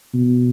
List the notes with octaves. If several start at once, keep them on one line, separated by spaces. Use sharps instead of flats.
B2